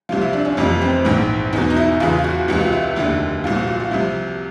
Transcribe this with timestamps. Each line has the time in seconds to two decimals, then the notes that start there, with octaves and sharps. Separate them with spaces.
0.09 C2 C3 F3 F4
0.21 E4
0.33 D4
0.45 C#4
0.57 F1 F2 C3 E3
0.81 C4
1.05 A#1 G#2 E3
1.53 E2 B2 D#4
1.70 D#4
1.76 E4
2.00 E2 C#3 E3 F4
2.19 F4
2.24 F#4
2.48 C#2 C3 E3 F#4
2.61 F4
2.72 E4
2.96 F1 D#2 D3 E4
3.44 C2 A#2 F3 F4
3.56 F#4
3.68 F4
3.80 F4
3.91 C2 C3 F3 E4